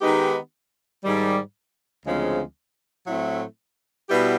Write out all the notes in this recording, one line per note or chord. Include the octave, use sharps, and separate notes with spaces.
D#3 G#3 B3 D#4 G4
G#2 D#3 G3
D2 C#3 F3 G#3 C4
A2 F#3 A3 C4 E4
B2 G3 B3 E4 G4